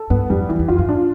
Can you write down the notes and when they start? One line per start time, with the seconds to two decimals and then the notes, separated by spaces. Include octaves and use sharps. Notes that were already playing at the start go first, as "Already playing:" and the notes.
Already playing: A4
0.10 G2 B3
0.30 F2 G3
0.49 F2 E3
0.59 E2
0.68 F2 F4
0.79 G2
0.89 A2 D4